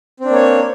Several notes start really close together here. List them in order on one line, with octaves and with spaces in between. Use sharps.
C4 D4 A#3 C#5